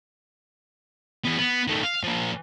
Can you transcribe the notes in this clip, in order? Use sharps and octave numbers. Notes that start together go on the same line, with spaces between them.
E2 B3
B3
D#3 A3
F5
F3 A#3